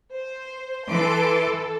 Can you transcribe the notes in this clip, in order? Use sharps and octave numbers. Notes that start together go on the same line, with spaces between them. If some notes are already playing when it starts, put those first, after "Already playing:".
C5
E3 A4 C6 D6